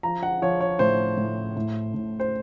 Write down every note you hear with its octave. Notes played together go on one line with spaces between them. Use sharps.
F3 A#5
F#5
F3 C#5
C#5
A2 C5
A2
A2
A2
C5